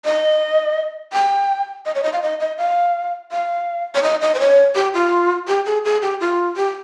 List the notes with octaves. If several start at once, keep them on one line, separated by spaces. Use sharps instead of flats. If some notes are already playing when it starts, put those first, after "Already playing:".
D#5
G5
D#5
C#5
D#5
F5
D#5
D#5
F5
F5
C#5
D#5
D#5
C5
C#5
G4
F4
G4
G#4
G#4
G4
F4
G4